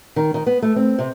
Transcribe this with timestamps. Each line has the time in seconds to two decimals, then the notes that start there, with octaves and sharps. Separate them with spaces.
0.16 D#3
0.34 D#3
0.46 B3
0.62 A3
0.76 C4
0.99 C3